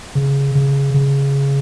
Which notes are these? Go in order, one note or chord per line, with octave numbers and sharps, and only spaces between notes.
C#3
C#3
C#3